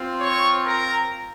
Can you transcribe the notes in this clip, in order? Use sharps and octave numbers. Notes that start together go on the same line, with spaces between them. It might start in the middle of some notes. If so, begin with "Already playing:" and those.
Already playing: C4 F4
C#5 C#6
A#4 A#5